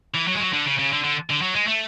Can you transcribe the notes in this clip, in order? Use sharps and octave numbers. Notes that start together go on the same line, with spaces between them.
E3
F#3
G#3
F#3
D3
C#3
C#3
D3
D3
D3
F#3
G#3
A3